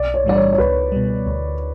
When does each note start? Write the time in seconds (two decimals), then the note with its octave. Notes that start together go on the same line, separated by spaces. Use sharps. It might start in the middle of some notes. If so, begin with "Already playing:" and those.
Already playing: B1 D5
0.14 C#5
0.24 A2 E3 G3 D4 D5
0.36 C#5
0.53 C#5
0.58 C#2 B4
0.92 B2 G3
1.27 D2